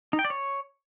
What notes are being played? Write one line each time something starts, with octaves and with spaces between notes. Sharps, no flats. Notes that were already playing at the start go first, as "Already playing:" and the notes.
D#4
G5
D5
C#5